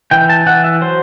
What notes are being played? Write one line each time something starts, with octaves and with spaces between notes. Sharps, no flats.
E3 G5
A5
E3 F#5
E5
F#3 C5